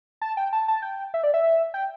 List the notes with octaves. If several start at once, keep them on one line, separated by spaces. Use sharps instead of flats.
A5
G5
A5
A5
G5
E5
D5
E5
G5